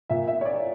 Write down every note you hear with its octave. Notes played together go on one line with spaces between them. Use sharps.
A#2 E5
E5
C#5
D5